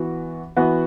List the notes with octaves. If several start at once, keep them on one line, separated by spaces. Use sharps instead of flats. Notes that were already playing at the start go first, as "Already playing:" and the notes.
Already playing: E3 B3 F#4
E3 B3 F#4